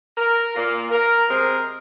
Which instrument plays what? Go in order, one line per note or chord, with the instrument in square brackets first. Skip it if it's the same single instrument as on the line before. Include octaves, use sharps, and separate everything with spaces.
[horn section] A#4
A#2 A#3 F4
A#4
C3 G#3 C4 A#4